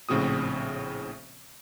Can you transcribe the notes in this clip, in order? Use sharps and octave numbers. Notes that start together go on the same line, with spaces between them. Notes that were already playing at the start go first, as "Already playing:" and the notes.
A#1 A2 C#3 C4 F#4 D#6